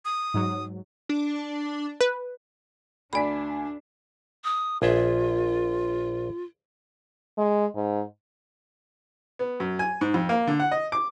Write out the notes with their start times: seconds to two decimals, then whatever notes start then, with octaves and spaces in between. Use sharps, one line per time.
0.05 D#6
0.34 G#2 F#3
1.09 D4
2.01 B4
3.13 D2 D4 D5 G#5 B5 B6
4.44 D#6
4.82 A#1 F4 G#4 E5
7.38 G#3
7.76 G#2
9.39 B3
9.60 F#2
9.79 G#5
10.01 G#2
10.14 F2
10.29 A#3
10.47 D3
10.60 F#5
10.71 D#5
10.92 D6